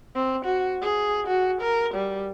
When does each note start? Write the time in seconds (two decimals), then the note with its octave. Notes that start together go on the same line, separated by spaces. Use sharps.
0.16 C4
0.45 F#4
0.82 G#4
1.27 F#4
1.61 A#4
1.95 G3